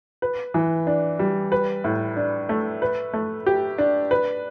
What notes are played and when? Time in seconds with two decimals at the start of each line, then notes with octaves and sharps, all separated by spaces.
0.22 B4
0.54 E3
0.87 D4
1.19 G3
1.52 B4
1.84 A2
2.17 D4
2.49 A3
2.82 B4
3.13 A3
3.46 G4
3.78 D4
4.11 B4